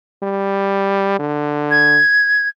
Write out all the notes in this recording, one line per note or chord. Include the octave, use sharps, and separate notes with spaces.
G3
D3
G#6